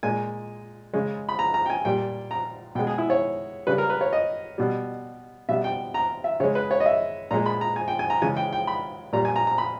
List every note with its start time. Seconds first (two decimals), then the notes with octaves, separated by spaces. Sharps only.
0.03 A#2 G#3 G#5
0.94 C#3 G#3
1.29 B5
1.39 A#5
1.54 A#5
1.66 G5
1.70 G#5
1.85 A#2 G3 G5
2.31 A#5
2.75 B2 G5
2.79 G#3
2.87 G#4
2.98 E4
3.10 C#5
3.67 C#3 G3 B4
3.78 A#4
3.90 B4
4.01 C#5
4.13 D#5
4.58 B2 G3
5.49 B2 G3 E5
5.64 G5
5.94 A#5
6.24 E5
6.40 C#3 G#3 C#5
6.55 B4
6.71 C#5
6.80 D#5
6.86 E5
7.31 A#2 G#3 A#5
7.46 B5
7.61 A#5
7.76 G#5
7.88 G5
7.99 G#5
8.10 A#5
8.22 C#3 E3 G#3 G#5
8.37 G5
8.53 G5
8.67 B5
9.13 A#2 G3 A#5
9.25 G#5
9.36 A#5
9.47 A#5
9.58 B5